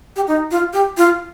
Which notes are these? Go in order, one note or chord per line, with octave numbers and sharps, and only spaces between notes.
G4
D#4
F4
G4
F4